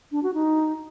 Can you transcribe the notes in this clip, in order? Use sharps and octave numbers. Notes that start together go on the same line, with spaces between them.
D4
F#4
D#4